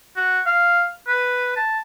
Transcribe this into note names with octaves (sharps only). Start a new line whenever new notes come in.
F#4
F5
B4
A5